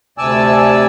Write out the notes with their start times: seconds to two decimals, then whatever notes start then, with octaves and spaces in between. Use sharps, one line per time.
0.18 D2 C3 D5 G#5 A5 E6